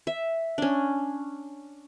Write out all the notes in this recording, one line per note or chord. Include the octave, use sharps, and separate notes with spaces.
E5
C#4 D4